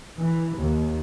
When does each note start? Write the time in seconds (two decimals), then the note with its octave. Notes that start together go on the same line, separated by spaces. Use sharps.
0.20 E3
0.58 D#2